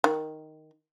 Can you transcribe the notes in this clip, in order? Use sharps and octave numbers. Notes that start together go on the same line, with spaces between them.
D#3